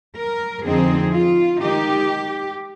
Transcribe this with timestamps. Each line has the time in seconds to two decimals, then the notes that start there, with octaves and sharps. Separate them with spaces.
0.17 A#4
0.65 F2 D3 F3 C4 D#4 G#4
1.13 F4
1.61 D#3 G#3 D#4 G4